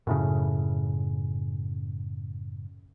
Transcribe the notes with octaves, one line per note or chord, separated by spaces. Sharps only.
F#2 A2 C#3